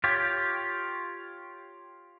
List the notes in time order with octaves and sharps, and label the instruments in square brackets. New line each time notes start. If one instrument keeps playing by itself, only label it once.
[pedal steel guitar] F4 G4 C#5